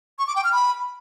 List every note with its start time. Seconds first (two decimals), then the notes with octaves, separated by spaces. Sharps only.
0.19 C#6
0.27 D6
0.36 G5
0.44 F6
0.52 B5